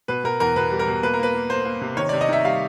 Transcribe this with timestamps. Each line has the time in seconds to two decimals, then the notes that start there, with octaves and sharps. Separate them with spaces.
0.08 B2 B4
0.24 B2 A#4
0.40 E2 A#4
0.56 B2 B4
0.71 G3
0.79 A#4
0.87 B2
1.03 A#3 B4
1.14 A#4
1.19 A#3 B4
1.35 A#3
1.50 A#3 C5
1.65 A#3
1.81 C3
1.97 D#3 C#5
2.09 C3 D5
2.21 D#5
2.29 D#3 E5
2.45 G3 F5